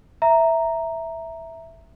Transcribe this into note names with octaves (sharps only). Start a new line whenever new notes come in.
E5 A#5